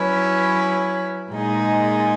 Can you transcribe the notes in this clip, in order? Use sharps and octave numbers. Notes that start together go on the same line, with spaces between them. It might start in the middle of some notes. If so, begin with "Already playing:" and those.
Already playing: F#3 C#4 E4 B4
A#2 G#3 D#4 G#4